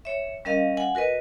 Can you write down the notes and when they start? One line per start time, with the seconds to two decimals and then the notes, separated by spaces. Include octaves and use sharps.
0.05 C#5 E5
0.45 G3 C#4 A#4 D#5 F5
0.77 F#5 G#5
0.95 F#4 A#4 B4 D#5